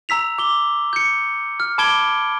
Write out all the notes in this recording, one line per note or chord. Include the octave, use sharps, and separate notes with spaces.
A#5 E6 B6 F7
D6 G7
G6 C#7
F6
A5 B5 D6 G#6 D7 G7